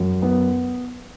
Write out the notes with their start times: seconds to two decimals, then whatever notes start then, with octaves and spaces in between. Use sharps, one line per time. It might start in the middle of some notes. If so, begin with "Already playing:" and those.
Already playing: F#2
0.22 B3